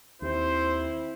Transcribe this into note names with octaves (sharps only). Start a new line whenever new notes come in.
D#2 C4 E4 C5